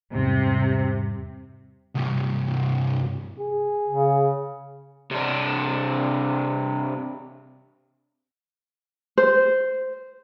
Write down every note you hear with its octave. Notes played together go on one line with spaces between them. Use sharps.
E2 G#2 C3 G3
C2 G2
G#4
C#3
C3 D4
C5